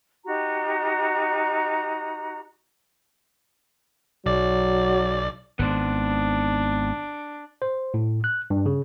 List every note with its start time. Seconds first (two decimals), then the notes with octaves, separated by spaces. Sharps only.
0.24 D#4 F#4 G4 A#5
4.26 B1 F#3 D5
5.59 G#1 B3 D4 C5
7.62 C5
7.94 A2
8.24 F#6
8.50 G2
8.66 C#3